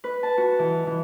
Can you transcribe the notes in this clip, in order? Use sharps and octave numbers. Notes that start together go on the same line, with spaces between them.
B4
A5
F#4
E3
E3